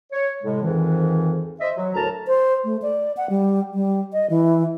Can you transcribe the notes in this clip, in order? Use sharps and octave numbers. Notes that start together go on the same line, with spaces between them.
C#5
A2 C3 G#3
F2 G#2 D#3 E3
C5 D#5 E5
F#3
D2 A2 F#4 A#4 A5 A#5
C5
A3
D5
F#5
G3
G3
D#5
E3